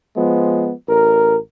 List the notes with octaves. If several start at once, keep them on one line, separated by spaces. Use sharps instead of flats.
F3 G#3 B3
A1 A#4